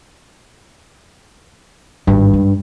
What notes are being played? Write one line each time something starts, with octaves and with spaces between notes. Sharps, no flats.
G#1 G2 D3
G#2